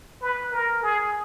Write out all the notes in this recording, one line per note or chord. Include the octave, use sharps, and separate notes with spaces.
B4
A#4
G#4